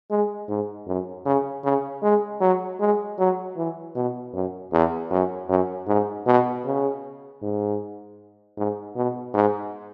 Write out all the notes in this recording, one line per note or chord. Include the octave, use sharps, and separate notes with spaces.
G#3
G#2
F#2
C#3
C#3
G#3
F#3
G#3
F#3
E3
B2
F#2
E2
F#2
F#2
G#2
B2
C#3
G#2
G#2
B2
G#2